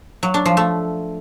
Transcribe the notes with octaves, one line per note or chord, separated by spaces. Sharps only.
F#3
D4
F3
A3